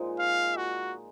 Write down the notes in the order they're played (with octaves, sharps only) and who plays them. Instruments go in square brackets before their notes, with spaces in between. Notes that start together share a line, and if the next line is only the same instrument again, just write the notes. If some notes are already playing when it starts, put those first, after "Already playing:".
Already playing: [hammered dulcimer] A#2 F3 G#3 D#4
[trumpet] F5
F#4